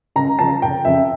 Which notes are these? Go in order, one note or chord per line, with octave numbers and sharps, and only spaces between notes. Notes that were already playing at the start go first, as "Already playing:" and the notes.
C#2 A#5
C#3 F3 A5
F1 G5
F2 C#3 E5